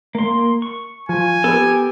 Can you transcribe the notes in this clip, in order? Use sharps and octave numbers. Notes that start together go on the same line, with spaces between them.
A#3 C6
C#6
F3 G#5
B3 G4 A4